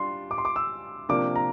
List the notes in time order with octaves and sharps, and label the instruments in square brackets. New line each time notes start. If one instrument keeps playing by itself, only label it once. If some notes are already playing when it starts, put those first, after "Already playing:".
Already playing: [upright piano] G3 D4 F4 [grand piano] C6
[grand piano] D6
C6
D6
E6
[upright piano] C3 F3 A#3 D4 [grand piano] D6
[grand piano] A#5